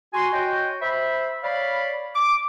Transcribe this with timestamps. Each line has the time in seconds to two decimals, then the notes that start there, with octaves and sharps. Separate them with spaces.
0.14 F#4 G#5 C6
0.33 F#4 C#5 D#5 G5
0.82 C5 E5 B5
1.43 C#5 D5 F5 B5
2.16 D6